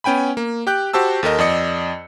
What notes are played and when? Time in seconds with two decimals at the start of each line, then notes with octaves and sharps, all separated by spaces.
0.04 B3 C#4 G5 G#5 B5
0.37 A#3
0.67 G4 G5 F#6 G6
0.93 F#4 G4 C5 A5 E6
1.23 D#2 A4 A#4 D#5
1.39 F2 D5 D#5 C#7